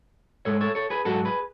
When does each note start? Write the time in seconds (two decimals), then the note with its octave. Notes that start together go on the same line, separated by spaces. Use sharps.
0.45 G#2 G#3 A4 C#5
0.61 A4 C#5
0.75 A4 C#5
0.90 G#4 B4
1.05 G#2 F#3 F#4 A4
1.25 G#4 B4